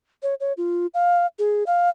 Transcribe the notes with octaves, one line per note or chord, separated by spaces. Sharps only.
C#5
C#5
F4
F5
G#4
F5